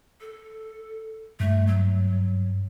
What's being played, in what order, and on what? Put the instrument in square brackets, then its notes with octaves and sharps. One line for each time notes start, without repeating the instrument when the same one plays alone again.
[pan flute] A4
[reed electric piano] G2 [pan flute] A3
[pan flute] F#3